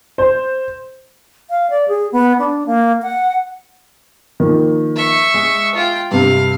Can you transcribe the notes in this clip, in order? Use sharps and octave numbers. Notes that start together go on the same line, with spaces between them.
C5
F5
D5
G#4
B3
D4
A#3
F#5
D#3 F3 A#3
E5 C#6
G#3
F4 G5
G2 C3 F5